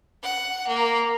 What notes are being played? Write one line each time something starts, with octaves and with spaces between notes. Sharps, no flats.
F#5
A#3